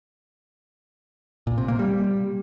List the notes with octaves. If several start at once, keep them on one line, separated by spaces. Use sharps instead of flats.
A#2
C3
A#3
G3